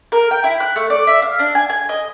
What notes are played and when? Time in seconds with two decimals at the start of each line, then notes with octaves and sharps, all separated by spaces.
0.12 A#4
0.31 G5
0.44 E4
0.60 F#6
0.76 A3
0.90 D5
1.07 E5
1.22 F5
1.39 D4
1.55 G#5
1.70 G#5
1.89 D#5